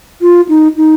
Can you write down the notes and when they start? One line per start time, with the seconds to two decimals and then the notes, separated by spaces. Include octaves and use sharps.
0.22 F4
0.49 D#4
0.77 D#4